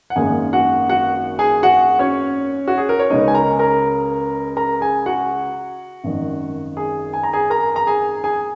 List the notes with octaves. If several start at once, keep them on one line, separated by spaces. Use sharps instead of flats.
F#5
G#1 F#2 D#3 A#3 G#4 G#5
F#4 F#5
F#4 F#5
G#4 G#5
F#4 F#5
C#4 C#5
F#4
G#4
A#4
C#5
C#2 C#3 G#3 C#4 D#4 D#5
G#5
A#4 A#5
A#4 A#5
A#4 A#5
G#4 G#5
F#4 F#5
G#1 F#2 D#3
G#4 G#5
G#5
A#5
G#4 G#5
A#4 A#5
A#5
G#4 G#5
G#4 G#5